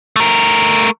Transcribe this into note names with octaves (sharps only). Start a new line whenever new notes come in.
A3 A#4